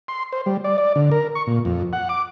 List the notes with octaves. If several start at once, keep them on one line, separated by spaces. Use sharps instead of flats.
C6
C5
G3
D5
D5
D3
A#4
C#6
A#2
F2
F#5
D6